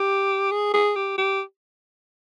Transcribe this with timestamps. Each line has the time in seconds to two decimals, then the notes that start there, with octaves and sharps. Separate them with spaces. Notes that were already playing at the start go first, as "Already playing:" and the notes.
Already playing: G4
0.51 G#4
0.74 G#4
0.96 G4
1.18 G4